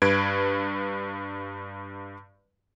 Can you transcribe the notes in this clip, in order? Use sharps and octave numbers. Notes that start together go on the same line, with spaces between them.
G2 B4 G#6 D7